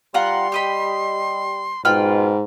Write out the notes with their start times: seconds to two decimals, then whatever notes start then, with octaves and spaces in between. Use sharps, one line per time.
0.14 G3 F4 F#5 A#5 C6
0.52 G4 D#5 B5
1.85 G#2 B2 F4 G5 B5 F6